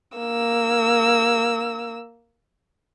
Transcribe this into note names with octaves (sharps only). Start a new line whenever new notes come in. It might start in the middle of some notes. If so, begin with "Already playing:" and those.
A#3 E6